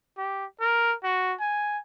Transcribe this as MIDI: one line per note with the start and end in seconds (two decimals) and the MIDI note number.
0.18 0.45 67
0.61 0.94 70
1.04 1.33 66
1.40 1.78 80